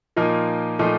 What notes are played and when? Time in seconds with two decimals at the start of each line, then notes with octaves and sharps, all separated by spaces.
0.16 A#2 F3 A#3 D#4
0.79 A#2 F3 A3 D#4